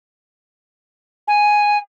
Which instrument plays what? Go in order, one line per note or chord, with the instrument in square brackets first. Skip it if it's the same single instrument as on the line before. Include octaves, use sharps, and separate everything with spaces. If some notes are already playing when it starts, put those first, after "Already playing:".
[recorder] G#5